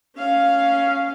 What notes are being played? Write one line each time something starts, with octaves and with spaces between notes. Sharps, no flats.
C#4 F5